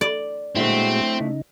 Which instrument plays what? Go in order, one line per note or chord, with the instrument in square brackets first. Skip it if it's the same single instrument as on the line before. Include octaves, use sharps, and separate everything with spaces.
[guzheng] D5
[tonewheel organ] A#2 G#3 F#4 [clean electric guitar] A3 D4 E4 [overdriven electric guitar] C4
[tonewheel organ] C#3 D#4